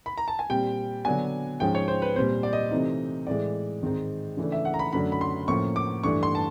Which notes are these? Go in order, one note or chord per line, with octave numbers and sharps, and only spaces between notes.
B5
A#5
A5
G#5
A#2 G3 C4 G5
D3 F#3 B3 D4 G#5
G#2 F3 G#3 C#4 G5
C#5
C5
B4
A#2 G3 C4 C5
D5
D#5
C3 E3 A3 C4 D#4
A2 E3 G#3 D5
G#2 D#3 G#3 C4 D#4
C#3 E3 A3 D4
E5
F#5
A#5
B5
F#2 D3 F#3 A3 D4 B5
B5
C6
A2 F3 A#3 C#4 C#6
D6
G2 E3 A3 D4 C#6
C6
A5